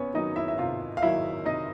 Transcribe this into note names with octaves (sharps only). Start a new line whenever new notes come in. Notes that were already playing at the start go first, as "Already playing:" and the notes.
Already playing: C3 B3 C#4 B4 C#5
D#3 F#3 D#4 D#5
E4 E5
E5
C3 F4 F5
F5
D#3 F#3 E4 E5
C3 D#4 D#5